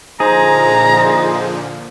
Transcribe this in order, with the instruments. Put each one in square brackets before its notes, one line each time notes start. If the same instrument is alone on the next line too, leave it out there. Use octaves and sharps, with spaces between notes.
[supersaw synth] A#2 D3 F3 [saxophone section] D#4 C5 [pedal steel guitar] G#4 [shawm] A#5